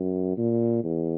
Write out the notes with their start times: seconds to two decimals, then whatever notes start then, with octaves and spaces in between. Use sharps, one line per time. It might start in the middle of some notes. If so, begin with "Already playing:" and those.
Already playing: F#2
0.37 A#2
0.84 E2